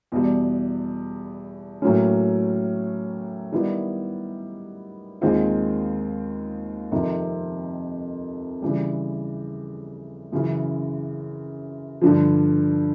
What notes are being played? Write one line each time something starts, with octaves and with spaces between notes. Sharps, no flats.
E2 B2 G3
A2 F#3 A#3 C#4
D#3 G3 B3 E4
D#2 D#3 G#3 C4 F4
F2 C3 D#3
C#3 E3 G3
F#2 C#3 E3
G2 D3 F3